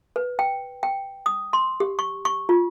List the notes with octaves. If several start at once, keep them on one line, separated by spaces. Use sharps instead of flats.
B4
G5
G5
D#6
C6
G4
C#6
C#6
F4